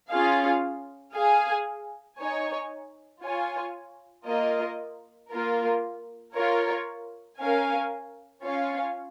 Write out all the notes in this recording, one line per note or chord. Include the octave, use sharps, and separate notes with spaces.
C#4 F4 G#4 F5
G#4 F5 G#5
D#4 C#5 G#5
F4 C#5 G#5
A#3 F4 A#4 D#5
A#3 F4 A#4
F4 A#4 C#5
C#4 A#4 F5 G#5
C#4 F4 C#5 F5